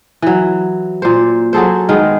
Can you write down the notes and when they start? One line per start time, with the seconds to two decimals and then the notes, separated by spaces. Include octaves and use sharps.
0.22 E3 F#3
1.02 A#2 C5
1.53 F#3 G#4 A4 C5
1.89 D#3 G#3 B3